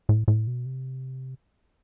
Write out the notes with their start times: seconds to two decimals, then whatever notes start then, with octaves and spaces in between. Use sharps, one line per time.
0.09 A2
0.28 A2
0.47 B2
0.66 C3